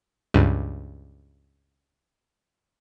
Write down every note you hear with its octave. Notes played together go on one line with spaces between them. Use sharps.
C#2 G2